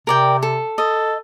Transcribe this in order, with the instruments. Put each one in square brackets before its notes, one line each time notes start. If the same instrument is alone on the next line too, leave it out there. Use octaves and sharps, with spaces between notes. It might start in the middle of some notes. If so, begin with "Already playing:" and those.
[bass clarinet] C3 [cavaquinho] A#4 D5 G5
[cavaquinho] A4
[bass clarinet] A4 [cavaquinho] D#5